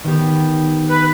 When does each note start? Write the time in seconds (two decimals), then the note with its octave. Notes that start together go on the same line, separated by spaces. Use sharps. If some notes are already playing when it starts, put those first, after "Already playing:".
0.04 D#3 B3 G4
0.90 B4